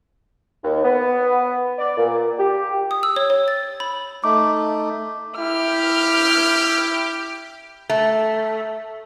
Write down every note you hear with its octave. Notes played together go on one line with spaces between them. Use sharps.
D#2
B3
D5
A#2
G4
D#6
E6
C#5
C#5
A6
B5
A3 D#4 D6
E4 G4 F6
A3